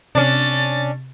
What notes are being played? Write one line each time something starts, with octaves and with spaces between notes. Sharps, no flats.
C3 C#4 D4 A6